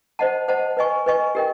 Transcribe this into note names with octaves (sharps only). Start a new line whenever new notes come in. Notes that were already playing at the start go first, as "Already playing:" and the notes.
C5 D#5 F#5 A5
C5 D#5 F#5 A5
B4 D#5 G#5 C#6
B4 D#5 G#5 C#6
G4 A#4 D#5 G5